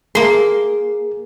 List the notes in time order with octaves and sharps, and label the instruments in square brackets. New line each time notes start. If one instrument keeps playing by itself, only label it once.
[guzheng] A#3 C6 [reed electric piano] G#4